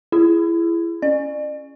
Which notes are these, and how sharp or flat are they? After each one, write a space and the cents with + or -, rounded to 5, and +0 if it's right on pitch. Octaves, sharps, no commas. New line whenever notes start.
E4 +30 G#4 +0
C#4 +0 D5 +40